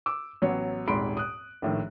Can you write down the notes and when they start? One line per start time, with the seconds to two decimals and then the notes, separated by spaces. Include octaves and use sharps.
0.06 D6 E6
0.42 A1 F#3 B3 C#5
0.88 D#1 G#1 G#2 B5 C6 D7
1.17 D#6 F#6
1.62 A#1 A2 D#3